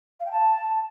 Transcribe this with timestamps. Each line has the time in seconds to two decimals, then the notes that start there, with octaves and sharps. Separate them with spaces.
0.20 F5
0.26 G5
0.31 A5